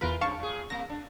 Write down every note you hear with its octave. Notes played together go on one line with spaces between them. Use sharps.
E2 E3 F4 A#4 B4 B5
G2 C#3 F5 A5 C#6
A#2 G#4
C3 A#3 A#6
D4